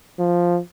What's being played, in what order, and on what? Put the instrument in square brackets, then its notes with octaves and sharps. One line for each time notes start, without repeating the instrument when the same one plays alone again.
[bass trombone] F3